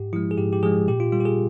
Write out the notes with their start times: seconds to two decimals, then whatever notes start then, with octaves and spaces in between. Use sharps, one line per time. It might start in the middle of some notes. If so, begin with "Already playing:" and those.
Already playing: G#2 G4
0.13 F3 G#3 E4
0.31 G#4
0.38 G#2 G4
0.53 G4
0.63 F3 G#3 G#4
0.88 A#2 G4
1.00 F4
1.12 G3 F4
1.20 G4
1.25 G#4